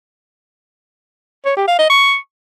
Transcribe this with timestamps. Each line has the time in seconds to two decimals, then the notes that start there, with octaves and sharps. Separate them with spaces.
1.46 C#5
1.57 G4
1.68 F5
1.79 D#5
1.90 C#6